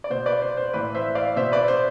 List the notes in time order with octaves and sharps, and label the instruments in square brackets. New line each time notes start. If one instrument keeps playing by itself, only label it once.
[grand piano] D5
B2 C5
B4 D5
C5
C5
A2 E3 B4 D5
C5 E5
D5 F5
B2 C5 E5
B4 D5
C5